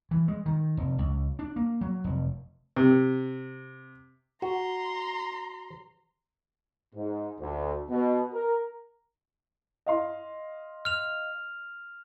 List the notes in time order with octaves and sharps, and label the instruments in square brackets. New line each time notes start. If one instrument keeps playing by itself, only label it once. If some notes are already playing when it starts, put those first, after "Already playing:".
[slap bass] E3
G#3
D#3
F1
C#2
D4
A#3
F#3
F1
[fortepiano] C3
[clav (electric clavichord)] F#4 [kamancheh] A#5 C6
[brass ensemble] G#2
D2
B2
A#4
[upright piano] D#5 F5 C6
[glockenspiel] F6 F7